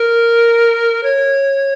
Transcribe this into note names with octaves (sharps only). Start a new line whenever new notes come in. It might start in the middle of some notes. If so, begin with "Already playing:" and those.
Already playing: A#4
C#5